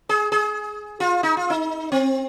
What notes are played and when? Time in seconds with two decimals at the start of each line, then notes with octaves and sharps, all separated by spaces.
0.09 G#4
0.32 G#4
1.00 F4
1.23 D#4
1.37 F4
1.50 D#4
1.92 C4